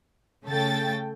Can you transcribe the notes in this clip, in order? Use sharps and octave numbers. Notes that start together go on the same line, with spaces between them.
C#3 A3 A4 G5 A6